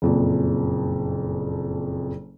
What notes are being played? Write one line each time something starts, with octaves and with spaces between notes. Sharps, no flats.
F#1 F2 A#2